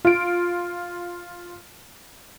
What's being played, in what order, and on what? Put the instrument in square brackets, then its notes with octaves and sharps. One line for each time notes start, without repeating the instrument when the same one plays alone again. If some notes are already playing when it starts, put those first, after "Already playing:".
[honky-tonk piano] F4 D7